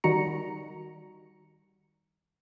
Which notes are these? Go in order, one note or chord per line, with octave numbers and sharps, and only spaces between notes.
D#3 G3 D#4 F#4 A#5 C#7